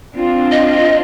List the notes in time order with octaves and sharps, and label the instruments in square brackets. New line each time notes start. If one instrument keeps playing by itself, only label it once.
[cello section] C4 D4 F4
[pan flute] D#5